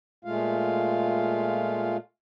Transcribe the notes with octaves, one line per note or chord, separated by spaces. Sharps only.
A#2 G#3 A3 F4 F5